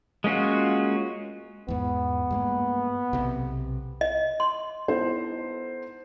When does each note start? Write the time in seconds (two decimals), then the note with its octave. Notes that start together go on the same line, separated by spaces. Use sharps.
0.24 G#3 A#3 C#4 F4 F#4
1.68 E2 G#2 B3
2.31 G2 G#3 A#3
3.13 B1 C3
4.01 D#5
4.40 C6
4.88 B3 D#4 E4 A4 C5